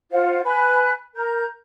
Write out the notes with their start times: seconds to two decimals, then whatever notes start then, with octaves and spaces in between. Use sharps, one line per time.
0.11 F4 C5 F5 F#5
0.45 B4 G#5 B5 F#6
1.15 A#4 A#5 G6